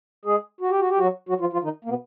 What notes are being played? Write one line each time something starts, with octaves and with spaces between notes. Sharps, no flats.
G#3 G#4
F#4
G4
F#4
G4
F#3 F#4
F#3 F#4
F3 F4
F3 F4
D#3 D#4
A#3
B2 B3